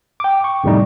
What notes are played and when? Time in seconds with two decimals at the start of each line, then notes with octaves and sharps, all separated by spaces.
0.20 G5 D6
0.44 C#6
0.64 F2 A2 C3 D#3 G3 D#4